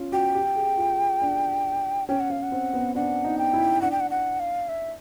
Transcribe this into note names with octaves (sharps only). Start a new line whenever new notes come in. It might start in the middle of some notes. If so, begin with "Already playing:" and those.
Already playing: C#4 F4
F#4 G5
G4
G#4
F4
D4
C#4 G5
F#5
C#4 F5
F#5
C4
B3
D4 F#5
D#4
G5
E4
D4 F#5
G5
F#5
F#5
F5
E5